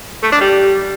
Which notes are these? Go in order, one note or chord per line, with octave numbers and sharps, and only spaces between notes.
A3
D4
G3